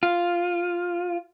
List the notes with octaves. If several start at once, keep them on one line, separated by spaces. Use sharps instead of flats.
F4